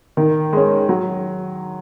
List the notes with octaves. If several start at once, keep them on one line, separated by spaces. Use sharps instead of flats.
D#3
G#3 C#4
F#3